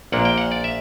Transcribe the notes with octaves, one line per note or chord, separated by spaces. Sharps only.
A#1 A#2 A#3 D4 F#5
G5
F#5
D5
E5